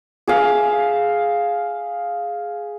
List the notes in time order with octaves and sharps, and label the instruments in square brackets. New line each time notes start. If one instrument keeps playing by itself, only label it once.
[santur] G#4 E5 F5